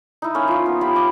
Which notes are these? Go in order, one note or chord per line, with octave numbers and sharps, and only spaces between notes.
D#4 E4
A#3 C#4
F3 F4
B3
F4 G4 B5
D6